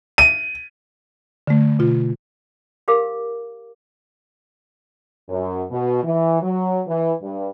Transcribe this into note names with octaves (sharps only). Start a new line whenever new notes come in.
D#7
D3 A3
B2 F4
G4 A#4 C5 F5 D6
F#2
B2
E3
F#3
E3
G2